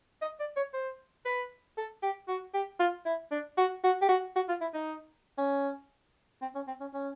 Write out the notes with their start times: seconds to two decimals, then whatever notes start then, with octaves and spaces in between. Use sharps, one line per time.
0.22 D#5
0.40 D5
0.56 C#5
0.74 C5
1.26 B4
1.78 A4
2.02 G4
2.28 F#4
2.54 G4
2.80 F4
3.05 E4
3.31 D4
3.58 F#4
3.84 F#4
4.02 G4
4.09 F#4
4.36 F#4
4.49 F4
4.61 E4
4.74 D#4
5.38 C#4
6.42 C4
6.55 C#4
6.68 C4
6.81 C#4
6.94 C#4